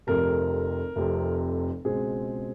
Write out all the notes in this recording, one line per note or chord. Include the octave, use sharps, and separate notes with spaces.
F1 F2 C3 A#4
F1 F2 C3
C#2 B2 G#3 C4 G#4